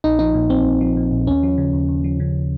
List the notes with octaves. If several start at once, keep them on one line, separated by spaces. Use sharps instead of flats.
A#1 D#4
F3 D#4
A#2
A#1 C4
A#1
F3
A#2
A#1
D#2 C#4
F3
C#3
D#2
D#2
F3
C#3